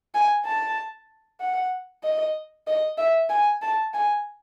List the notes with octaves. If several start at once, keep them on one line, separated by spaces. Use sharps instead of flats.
G#5
A5
F#5
D#5
D#5
E5
G#5
A5
G#5